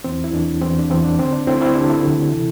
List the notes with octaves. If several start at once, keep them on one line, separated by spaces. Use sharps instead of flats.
E2 E3 C4
E4
E2 E3 D4
E2 E3 C4
D4
E2 E3 C4
D4
D2 D3 C4
D4
D2 D3 C4 E4
C4 E4
D2 D3 D4 G4
E4 A4
D2 D3
C3 E3